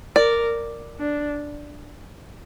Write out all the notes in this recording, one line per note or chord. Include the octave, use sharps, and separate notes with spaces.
A#4 D5
D4